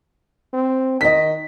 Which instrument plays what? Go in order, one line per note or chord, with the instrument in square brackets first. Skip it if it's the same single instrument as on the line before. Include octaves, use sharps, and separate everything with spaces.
[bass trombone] C4
[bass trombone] D#3 [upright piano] D#5 B6